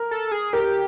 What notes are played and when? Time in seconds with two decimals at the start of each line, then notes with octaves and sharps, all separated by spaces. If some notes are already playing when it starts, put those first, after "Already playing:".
Already playing: A#4
0.11 A4
0.32 G#4
0.53 G4 A#4